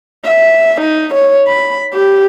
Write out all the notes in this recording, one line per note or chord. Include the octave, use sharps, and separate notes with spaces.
E5
D#4
C#5
B5
G4